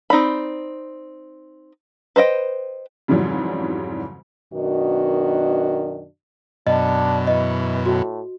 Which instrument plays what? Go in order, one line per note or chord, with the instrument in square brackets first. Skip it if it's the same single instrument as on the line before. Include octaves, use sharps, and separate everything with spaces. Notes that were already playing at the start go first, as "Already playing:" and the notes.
[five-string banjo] C4 D#4 D5 B5
B4 C5 D#5 G5
[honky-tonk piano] F2 G#2 C#3 E3 F#3 G3
[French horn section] F#2 B2 D#3 D4 F#4
[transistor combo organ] F#2 B2 [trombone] D4 [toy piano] D#5
[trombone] E3 [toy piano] D#5
[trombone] A2 [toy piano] F#4